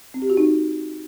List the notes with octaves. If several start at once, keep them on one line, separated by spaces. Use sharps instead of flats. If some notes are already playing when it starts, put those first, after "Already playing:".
C4
G4
F#4
D#4